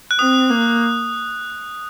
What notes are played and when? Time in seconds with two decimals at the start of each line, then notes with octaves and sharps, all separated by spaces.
0.11 F#6
0.19 C4 D#6
0.50 A#3